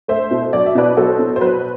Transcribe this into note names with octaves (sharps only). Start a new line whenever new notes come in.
A3 C5 E5
B2
F#3 D5
E5
B2 B4 D5
F#3 A4 C5
B2
C5
F#3 B4